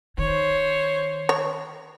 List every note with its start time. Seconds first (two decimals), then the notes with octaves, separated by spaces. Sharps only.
0.18 D#3 C5 C#5
1.29 C#5